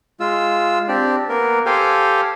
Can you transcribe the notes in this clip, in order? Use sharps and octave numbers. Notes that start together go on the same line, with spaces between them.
G#3 F4 E6
C4 D4 G4 D5
A#3 B3 A#4
G4 A4 C5 F5 G5 G#5